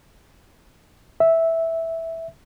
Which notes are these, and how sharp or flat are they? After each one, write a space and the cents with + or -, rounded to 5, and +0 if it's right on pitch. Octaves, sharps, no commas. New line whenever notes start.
E5 -5